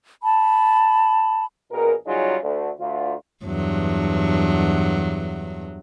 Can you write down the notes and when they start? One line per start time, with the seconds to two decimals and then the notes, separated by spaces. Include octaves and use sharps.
0.23 A5 B5
1.72 A#1 B2 G#4 A#4
2.07 C#3 F#3 G3 D#4 F4 G#4
2.43 D2
2.80 D2 F4
3.45 E2 G2 F#3